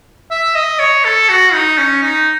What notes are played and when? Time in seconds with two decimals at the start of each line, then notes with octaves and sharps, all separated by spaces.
0.31 E5
0.55 D#5
0.79 C#5
1.05 A4
1.29 F#4
1.53 D#4
1.78 C#4
2.03 D#4